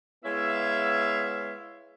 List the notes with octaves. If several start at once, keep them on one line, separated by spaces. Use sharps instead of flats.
G#3 B3 E4 C#5 E5 F5